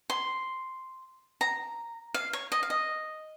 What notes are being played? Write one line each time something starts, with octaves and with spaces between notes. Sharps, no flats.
C6
A#5
F5
C#5
D#5
F5
D#5